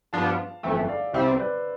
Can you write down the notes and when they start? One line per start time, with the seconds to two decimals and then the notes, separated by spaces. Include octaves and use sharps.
0.13 G2 F3 B3 D4 F4 F5 A5
0.63 G1 F2 E3 A3 E5 G5
0.88 D5 F5
1.13 C2 C3 G3 C4 C5 E5
1.39 B4 D5